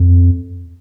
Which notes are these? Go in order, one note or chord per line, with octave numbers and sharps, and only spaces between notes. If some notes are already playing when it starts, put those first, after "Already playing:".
Already playing: F2